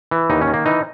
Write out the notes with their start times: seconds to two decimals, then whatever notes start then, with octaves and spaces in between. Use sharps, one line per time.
0.11 E3
0.30 D#2 D#4
0.41 C#4
0.47 D#3
0.54 A#3
0.66 E3 D#4